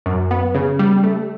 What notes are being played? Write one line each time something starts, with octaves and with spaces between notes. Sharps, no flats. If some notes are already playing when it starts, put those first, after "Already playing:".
F#2
B3
C#3
G3
A3